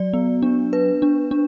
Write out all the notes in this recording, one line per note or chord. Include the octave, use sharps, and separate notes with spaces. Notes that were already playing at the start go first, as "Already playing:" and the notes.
Already playing: F#3 D5
B3
D4
B4
D4
D4